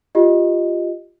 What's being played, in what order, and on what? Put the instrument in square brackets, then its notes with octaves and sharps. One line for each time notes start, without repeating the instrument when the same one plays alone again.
[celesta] F4 G4 D#5